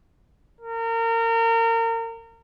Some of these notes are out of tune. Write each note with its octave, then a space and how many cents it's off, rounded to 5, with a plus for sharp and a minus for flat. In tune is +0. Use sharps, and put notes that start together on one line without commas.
A#4 -30